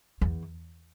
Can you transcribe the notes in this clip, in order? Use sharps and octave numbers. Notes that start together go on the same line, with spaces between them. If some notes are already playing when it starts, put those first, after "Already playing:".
E2